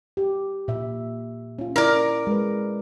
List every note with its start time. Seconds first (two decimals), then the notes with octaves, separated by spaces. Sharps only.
0.17 G4
0.68 A#2 E5
1.59 C#4 F4
1.76 E4 A#4 D5
2.27 G#3 B4